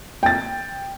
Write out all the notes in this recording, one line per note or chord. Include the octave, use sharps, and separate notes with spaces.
G5 A6